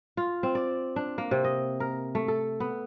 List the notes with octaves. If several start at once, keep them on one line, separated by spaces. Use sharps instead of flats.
F4
C4
D5
D4
A#3
C3
D#5
A#4
A3
A4
B3